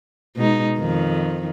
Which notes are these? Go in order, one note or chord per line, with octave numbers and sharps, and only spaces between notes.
B2 G#3 D#4
F2 D#3